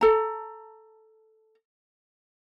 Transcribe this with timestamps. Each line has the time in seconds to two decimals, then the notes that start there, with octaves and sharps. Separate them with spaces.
0.01 A4 A#5